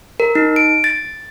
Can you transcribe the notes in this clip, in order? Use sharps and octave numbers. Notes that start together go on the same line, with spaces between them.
A#4
D#4
D7
A6